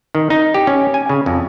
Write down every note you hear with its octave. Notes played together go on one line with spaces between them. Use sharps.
D#3
D#4
G4
C#4
G#5
C#3
F2